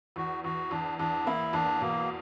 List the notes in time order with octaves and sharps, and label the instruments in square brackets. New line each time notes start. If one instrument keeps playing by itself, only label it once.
[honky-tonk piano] E2 [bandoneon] F#4
[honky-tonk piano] E2 [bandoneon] F#4
[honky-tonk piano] E2 [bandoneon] D4
[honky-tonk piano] E2 [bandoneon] D4
[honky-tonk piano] A#3 [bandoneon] E4
[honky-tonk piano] E2 [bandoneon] D4
[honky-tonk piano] B2 [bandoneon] A#3